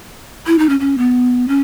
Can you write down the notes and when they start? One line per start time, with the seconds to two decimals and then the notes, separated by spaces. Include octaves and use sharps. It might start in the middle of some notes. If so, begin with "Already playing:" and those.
0.47 E4
0.59 D#4
0.69 C#4
0.80 C#4
0.98 B3
1.48 C#4